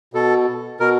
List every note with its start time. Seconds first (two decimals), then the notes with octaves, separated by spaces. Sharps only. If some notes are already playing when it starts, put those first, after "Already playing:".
0.13 B2 A4
0.80 B2 A#4